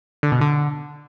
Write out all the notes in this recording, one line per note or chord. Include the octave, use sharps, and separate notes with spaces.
D3
B2
D3